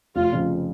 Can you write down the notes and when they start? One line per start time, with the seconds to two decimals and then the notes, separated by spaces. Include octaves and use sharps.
0.15 F1 F4
0.33 F2 C#3